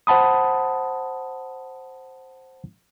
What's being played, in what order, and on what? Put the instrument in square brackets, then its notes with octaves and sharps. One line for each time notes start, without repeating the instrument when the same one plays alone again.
[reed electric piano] C5 F#5 A5 B5 D#6